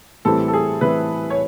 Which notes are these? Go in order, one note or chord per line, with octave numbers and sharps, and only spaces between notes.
A2 E3 G3 C4 E4 A4
A4
G#4
A2 E3 G3 C4 E4 B4
C#5